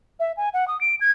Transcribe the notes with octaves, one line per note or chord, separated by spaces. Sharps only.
E5
G#5
F#5
D#6
D7
G#6